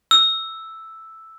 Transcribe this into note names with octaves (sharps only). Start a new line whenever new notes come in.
E6